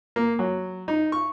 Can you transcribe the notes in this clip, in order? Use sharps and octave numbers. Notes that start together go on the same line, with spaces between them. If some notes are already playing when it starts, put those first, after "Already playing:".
A#3
F#3
D#4
C#6